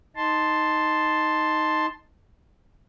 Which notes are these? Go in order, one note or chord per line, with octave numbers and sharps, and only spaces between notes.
D#4 A5 C6